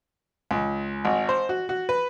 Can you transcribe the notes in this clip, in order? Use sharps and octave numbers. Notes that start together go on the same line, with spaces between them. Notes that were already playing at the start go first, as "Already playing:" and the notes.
C#2
G#1
C5
F#4
F#4
B4